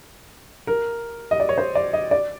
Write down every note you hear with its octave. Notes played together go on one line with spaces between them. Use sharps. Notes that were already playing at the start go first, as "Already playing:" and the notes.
A#4
D#5
D5
C#5
C5
D5
D#5
D5